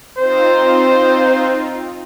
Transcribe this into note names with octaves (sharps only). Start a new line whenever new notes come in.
C4 D#4 F4 C5